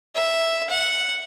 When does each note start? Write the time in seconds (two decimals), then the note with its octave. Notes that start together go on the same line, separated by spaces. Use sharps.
0.15 E5
0.70 F#5